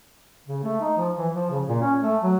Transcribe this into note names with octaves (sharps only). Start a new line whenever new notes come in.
C#3
A3
D#4
F3
E3
F3
C#3
A#2
C#4
A3
F#3